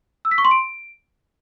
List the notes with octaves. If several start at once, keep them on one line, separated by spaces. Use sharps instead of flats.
E6
B6
C#6
C6
D7